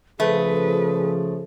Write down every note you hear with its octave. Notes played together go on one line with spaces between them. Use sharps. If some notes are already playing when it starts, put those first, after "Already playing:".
C#3 F3 A3 G#4 B4